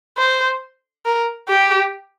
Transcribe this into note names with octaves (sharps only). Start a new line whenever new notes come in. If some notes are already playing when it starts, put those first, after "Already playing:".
C5
A#4
G4